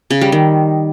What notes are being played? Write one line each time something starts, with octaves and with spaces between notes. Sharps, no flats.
C#3
G3
D#3